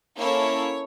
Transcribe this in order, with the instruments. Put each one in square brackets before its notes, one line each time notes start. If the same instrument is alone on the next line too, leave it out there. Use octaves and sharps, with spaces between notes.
[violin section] A#3 C#4 E4 A4 C#5